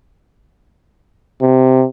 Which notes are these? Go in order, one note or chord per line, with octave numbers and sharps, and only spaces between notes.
C3